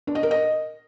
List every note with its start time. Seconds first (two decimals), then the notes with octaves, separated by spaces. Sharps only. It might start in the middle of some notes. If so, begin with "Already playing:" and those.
0.07 D4
0.15 D#5
0.23 A#4
0.31 D#5